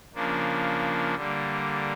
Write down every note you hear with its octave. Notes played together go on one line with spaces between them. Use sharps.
C#3 F3 A#3 D4
D3 G3 A#3